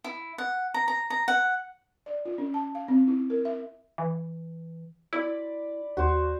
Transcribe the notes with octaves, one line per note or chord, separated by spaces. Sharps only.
E4
F#5
A#5
A#5
A#5
F#5
D5
F4
C#4
A5
F5
C4
E4
A#4
E5
E3
E4 D5 B5 D6
D#2 F#4 C5